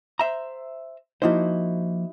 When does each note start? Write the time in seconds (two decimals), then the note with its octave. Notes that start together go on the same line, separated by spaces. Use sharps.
0.19 C5 E5 A#5
1.22 F3 A#3 D#4 E4 F#4 C5